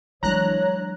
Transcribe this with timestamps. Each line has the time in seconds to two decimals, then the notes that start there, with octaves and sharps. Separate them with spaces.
0.23 E3 F#3 G#3 D4 C#5 A#5 F#6